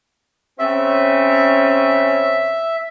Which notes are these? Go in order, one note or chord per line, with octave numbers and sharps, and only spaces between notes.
C#3 C4 C#4 E5